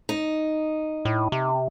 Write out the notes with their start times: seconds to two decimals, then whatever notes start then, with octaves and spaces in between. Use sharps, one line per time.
0.09 D#4
1.05 A2
1.32 C3